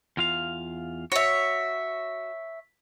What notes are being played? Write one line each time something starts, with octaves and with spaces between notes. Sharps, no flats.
E2 F4 F5
F#4 C#5 E5